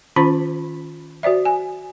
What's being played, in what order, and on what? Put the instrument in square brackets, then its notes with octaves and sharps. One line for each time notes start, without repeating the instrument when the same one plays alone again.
[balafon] D#3 C#4 F4 C5 A5 B5
F#4 C5 D5 E5
G#5